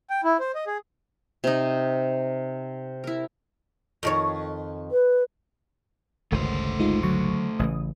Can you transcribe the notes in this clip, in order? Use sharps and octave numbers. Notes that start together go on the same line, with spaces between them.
G5
E4
C5
D#5
G#4
C3 D#4
E4 A#4
F2 D#3 C#5
B4
G1 C#2 D#3 A3 C5
G#3 D#4 F4
D3 F#3 C#6
A1 C#3 E3 D#6